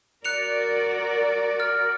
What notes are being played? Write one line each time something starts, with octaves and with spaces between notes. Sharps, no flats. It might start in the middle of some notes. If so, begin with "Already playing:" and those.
F#4 A#4 D5 F#6 C#7 F7
F6